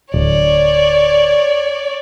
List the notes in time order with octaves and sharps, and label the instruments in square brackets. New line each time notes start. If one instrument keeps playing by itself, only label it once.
[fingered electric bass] D1 [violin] C#5 D5